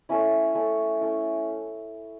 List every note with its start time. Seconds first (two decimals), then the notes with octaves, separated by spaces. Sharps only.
0.09 A3 C#4 E4
0.55 A3 C#4 E4
1.01 A3 C#4 E4